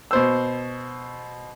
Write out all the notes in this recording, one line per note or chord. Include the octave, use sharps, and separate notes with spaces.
B2 C5 E6